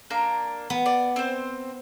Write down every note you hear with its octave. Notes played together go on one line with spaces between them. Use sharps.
A#3 D4 A#5
B3
D5
C4 C5